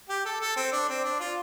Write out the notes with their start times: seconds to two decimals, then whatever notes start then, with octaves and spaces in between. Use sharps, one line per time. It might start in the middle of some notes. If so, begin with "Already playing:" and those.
0.09 G4
0.25 A4
0.41 A4
0.56 C4
0.72 D4
0.88 C4
1.04 D4
1.20 F4